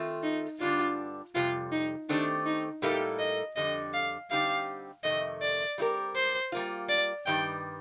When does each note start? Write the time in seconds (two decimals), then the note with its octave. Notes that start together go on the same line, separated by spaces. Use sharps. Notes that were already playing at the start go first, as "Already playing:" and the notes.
Already playing: D#3 A3 C4 F4
0.23 D#4
0.60 G2 D3 G3 D4 F4
1.35 F2 C3 G3 F4
1.72 D#4
2.09 D#3 A3 C4 D4 G4
2.46 D#4
2.82 A2 G3 A#3 D#4 G4 A4
3.19 D#5
3.56 F2 D3 G3 D#5
3.94 F5
4.31 D3 G3 C4 D#4 G4 F5
5.04 F2 C3 D#3 A3 D#5
5.42 D5
5.78 G3 C4 D#4 G4 A#4
6.16 C5
6.52 G3 A#3 F4
6.89 D5
7.26 G2 D#3 G3 G5